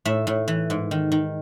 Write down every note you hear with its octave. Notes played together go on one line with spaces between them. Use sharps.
A2 E5
A2
E3
G#2
D#3
D#3